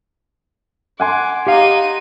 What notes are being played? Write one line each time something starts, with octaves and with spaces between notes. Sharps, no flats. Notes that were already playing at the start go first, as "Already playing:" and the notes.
F#5 G#5 C6 D6
D#4 G4 F5 D#7